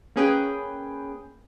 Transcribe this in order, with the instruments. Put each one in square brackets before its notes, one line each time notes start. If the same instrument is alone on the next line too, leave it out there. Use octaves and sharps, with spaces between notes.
[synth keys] A#3 C#4 G#4 B4 G5